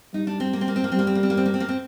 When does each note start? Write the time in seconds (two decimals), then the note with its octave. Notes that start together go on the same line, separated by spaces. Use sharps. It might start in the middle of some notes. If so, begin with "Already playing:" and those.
0.14 G3 D#4
0.27 D4
0.40 C4
0.53 A#3
0.61 C4
0.68 A#3
0.76 C4
0.84 A#3
0.92 G3 C4
0.99 A#3
1.07 C4
1.15 A#3
1.23 C4
1.30 A#3
1.37 C4
1.46 A#3
1.54 C4
1.60 A#3
1.69 C4